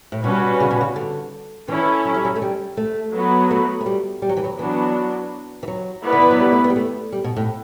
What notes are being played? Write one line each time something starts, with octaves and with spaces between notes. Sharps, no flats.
A2
B2 G3 C#4 F#4 B4
C#3
B2
C#3
D3
E3 C#4 E4 A4
F#3
G3
F#3
A3
G3
A3
F#3 B3 F#4 B4
A3
A3
G3
G3
F#3
E3
F#3
E3 F#3 B3 D4 F#4
E3
F#3
B3 E4 B4 D5
D3
E3
F#3
G3
A3
B3
G3
A3
G3
B2
A2